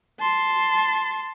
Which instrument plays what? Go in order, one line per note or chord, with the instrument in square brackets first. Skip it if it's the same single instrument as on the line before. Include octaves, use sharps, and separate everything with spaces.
[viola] A5 C6